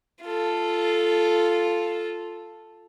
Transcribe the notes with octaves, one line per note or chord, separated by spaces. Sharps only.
F4 A4